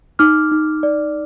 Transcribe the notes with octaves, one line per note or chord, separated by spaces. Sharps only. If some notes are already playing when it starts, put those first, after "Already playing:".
D#4 D6 F6
D#4
D5